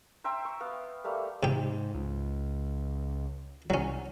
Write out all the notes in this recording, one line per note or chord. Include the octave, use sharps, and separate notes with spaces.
C5 E5 G5 A#5
C#6
B3 F5
G3 A3 A#3
G#2 C3 G4
C#2
C2 F#3 C#4